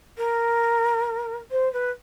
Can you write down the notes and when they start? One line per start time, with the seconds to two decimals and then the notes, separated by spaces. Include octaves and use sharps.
0.17 A#4
1.51 C5
1.72 B4